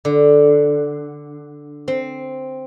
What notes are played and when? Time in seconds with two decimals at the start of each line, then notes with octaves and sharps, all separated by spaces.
0.05 D3
1.88 C4